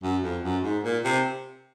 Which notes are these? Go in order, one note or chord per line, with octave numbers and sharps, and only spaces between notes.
F#2
F2
F#2
G#2
A#2
C3